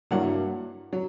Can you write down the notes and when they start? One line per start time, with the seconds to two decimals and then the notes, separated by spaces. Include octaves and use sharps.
0.11 G2 F#3 A#3 E4 F#5
0.93 F#3